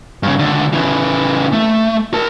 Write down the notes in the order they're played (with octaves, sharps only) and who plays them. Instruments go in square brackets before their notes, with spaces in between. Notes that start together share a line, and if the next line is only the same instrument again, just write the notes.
[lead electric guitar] G2 C#3
C#2 D3
C#3 E3
A3
A#4 A5